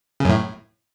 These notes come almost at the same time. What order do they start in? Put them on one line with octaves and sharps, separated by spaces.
C#3 F#2 A2